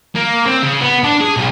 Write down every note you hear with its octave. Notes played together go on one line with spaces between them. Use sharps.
A#3
C4
C#3
B3
D4
G#4
B1